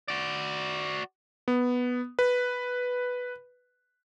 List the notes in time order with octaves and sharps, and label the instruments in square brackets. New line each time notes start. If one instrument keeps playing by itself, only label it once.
[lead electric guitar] F#4 D5
[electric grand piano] B3
B4